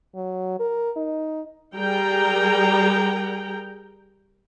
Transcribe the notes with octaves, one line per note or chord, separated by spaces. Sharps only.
F#3
A#4
D#4
G3 G#4 A#4 G5 A#5